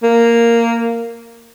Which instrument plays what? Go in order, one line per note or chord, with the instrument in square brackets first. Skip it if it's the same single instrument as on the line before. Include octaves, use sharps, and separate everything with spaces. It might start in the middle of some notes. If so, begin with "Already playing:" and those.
[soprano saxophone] A#3